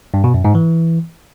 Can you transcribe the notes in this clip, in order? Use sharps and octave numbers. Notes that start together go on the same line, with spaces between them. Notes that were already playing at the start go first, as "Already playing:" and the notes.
G2
B2
F#2
G#2
E3